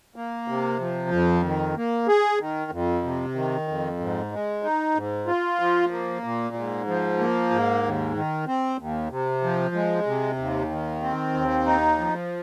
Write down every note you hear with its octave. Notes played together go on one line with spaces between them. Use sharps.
A#3
C3
F3
F2
D#3
A#3
G#4
D#3
F2
C3
D#3
F2
G#2
G#3
D#4
G#2
F4
F3
A#3
A#2
G#2
F3
A#3
G#2
D#2
D#3
C4
D#2
C3
F3
G#3
C3
D#2
D#3
C4
D#2
D#4
F3